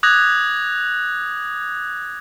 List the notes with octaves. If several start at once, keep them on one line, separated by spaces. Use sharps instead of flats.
D6 D#6 F#6 G#6 A#6 F7